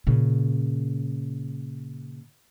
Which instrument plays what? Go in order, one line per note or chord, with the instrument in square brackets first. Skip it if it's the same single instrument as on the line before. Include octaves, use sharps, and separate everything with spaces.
[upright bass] A#2 C#3